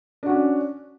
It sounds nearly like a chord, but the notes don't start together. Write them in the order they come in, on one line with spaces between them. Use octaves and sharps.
D4 F#4 C#4